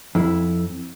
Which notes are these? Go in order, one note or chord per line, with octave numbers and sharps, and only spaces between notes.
F2 E4